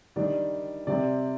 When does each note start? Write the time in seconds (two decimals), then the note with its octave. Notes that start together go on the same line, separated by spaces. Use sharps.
0.16 D#3 G3 D4 D5
0.87 C3 G3 C4 D5